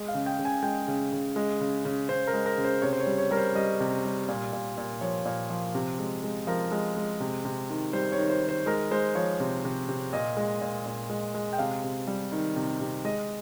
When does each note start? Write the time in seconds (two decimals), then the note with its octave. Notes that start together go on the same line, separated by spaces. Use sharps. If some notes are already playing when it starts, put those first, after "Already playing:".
Already playing: G#3
0.08 F5
0.14 C#3
0.26 G5
0.39 C#3
0.45 G#5
0.63 G#3 G5
0.88 C#3
1.12 C#3
1.36 G#3
1.61 C#3
1.85 C#3
2.09 C#3 C5
2.27 A#4
2.33 G#3
2.46 A#4
2.58 C#3
2.65 C5
2.82 C3 C#5
2.93 C5
3.00 C#5
3.06 G3
3.18 C#5
3.31 G3 A#4
3.37 C5
3.55 G3 D#5
3.80 C3
4.05 G3
4.28 A#2
4.53 A#2
4.77 A#2
5.01 F3 C#5
5.25 A#2
5.50 F3
5.75 C3
5.99 G#3
6.24 G#3
6.47 F3 A#4
6.72 G#3
6.97 G#3
7.20 C3
7.45 C3
7.70 D#3
7.93 G3 C5
8.12 C#5
8.18 D#3
8.30 C5
8.42 D#3
8.49 C5
8.66 G#3 A#4
8.91 G#3 C5
9.15 F3 C#5
9.40 C3
9.65 C3
9.88 C3
10.13 A#2 D#5
10.37 G#3
10.61 A#2
10.85 A#2
11.10 G#3
11.34 G#3
11.53 G5
11.58 C3 F5
11.84 C3
12.07 G3
12.32 D#3
12.56 C3
12.81 C3
13.04 G#3 D#5